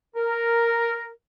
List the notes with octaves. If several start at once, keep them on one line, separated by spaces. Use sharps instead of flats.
A#4